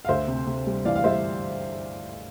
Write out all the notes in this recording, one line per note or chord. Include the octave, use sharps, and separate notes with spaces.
F5
D2 C5 E5
C3
C3
G3
E3 D5 F5
F5
G3 C5 E5